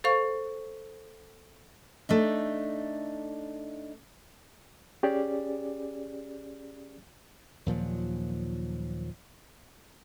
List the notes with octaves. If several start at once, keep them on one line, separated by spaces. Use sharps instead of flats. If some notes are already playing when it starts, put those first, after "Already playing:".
A4 C5 F5 C#6
A3 D4 D#4
C#4 G4 G#4 D5
D#2 A#2 F3 F#3